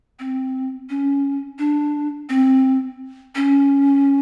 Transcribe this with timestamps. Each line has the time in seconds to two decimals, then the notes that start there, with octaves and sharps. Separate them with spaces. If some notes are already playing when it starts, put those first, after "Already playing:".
0.19 C4
0.90 C#4
1.59 D4
2.29 C4
3.35 C#4